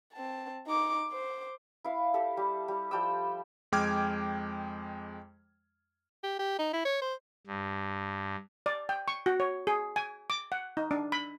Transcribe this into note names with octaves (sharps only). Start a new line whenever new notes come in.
C4 A5
D#4 D6
C5 D6
E4 F5
G4 A4
G3
G3
F3 G3 G5 E6
F2 G#3 G5 D6 F6 G#6
G4
G4
D#4
E4
C#5
C5
G2
D5
G5
C#6
F#4
C#5
G#4
G#5
D6
F#5
D#4
D4
B5